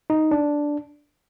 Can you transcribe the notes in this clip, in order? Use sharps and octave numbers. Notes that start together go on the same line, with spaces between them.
D#4
D4